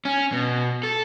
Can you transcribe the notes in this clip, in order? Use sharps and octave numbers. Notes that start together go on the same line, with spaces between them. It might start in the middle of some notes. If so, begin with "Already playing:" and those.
C#4
B2
A4